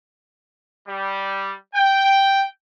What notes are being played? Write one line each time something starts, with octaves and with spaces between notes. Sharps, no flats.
G3
G5